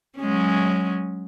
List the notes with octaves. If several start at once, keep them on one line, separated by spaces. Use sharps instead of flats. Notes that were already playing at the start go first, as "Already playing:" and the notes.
F#3 G#3 C#4